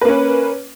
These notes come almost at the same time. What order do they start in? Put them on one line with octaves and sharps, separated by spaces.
B4 A#3 C#4